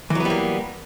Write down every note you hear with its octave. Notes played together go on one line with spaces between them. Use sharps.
E3 F#3 G3 A#3 B3